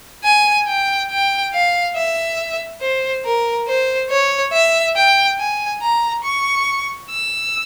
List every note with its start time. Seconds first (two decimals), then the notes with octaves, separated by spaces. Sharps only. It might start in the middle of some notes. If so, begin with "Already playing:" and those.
0.24 G#5
0.67 G5
1.11 G5
1.54 F5
1.96 E5
2.81 C5
3.25 A#4
3.68 C5
4.10 C#5
4.53 E5
4.96 G5
5.39 G#5
5.82 A#5
6.24 C#6
7.10 E6